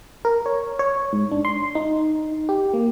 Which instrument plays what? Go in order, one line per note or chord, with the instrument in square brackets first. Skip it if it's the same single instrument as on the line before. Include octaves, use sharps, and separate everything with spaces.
[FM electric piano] A#4
C#5
C#5
G#2
D4
C6
D#4
G4
A#3